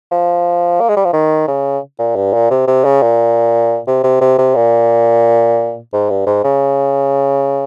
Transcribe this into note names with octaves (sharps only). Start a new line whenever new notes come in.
F3
A#3
G#3
G3
F3
D#3
C#3
A#2
G2
A#2
C3
C3
C#3
A#2
C3
C3
C3
C3
A#2
G#2
G2
G#2
C#3